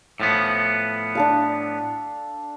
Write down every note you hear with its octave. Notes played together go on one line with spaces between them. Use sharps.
A2 F3 B3
D4 A4 F5